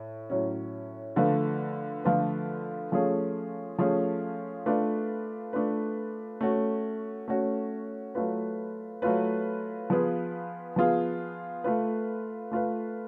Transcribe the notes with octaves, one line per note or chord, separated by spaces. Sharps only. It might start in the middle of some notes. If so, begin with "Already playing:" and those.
Already playing: A2
A2 F#3 C#4
D3 F3 A3 F4 B4
D3 F3 A3 F4 B4
F3 A3 C#4 F4 G#4
F3 A3 C#4 F4 G#4
A3 D4 F4 B4
A3 D4 F4 B4
A3 C#4 F#4
A3 C#4 F#4
F#3 A3 F4 B4
F#3 A3 F4 B4
F3 B3 F4 G#4 B4
F3 B3 F4 G#4 B4
A3 F4 B4
A3 F4 B4